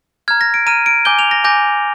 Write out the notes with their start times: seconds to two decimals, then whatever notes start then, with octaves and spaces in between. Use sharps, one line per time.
0.28 A#5 F6 G#6
0.41 A#6
0.54 D7
0.67 A#5 F6 D#7
0.86 D7
1.05 G#5 D6 G6 G7
1.19 F7
1.31 A#6
1.44 G#5 D6 G6 A#6